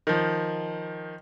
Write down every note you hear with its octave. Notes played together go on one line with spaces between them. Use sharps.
D#3 F3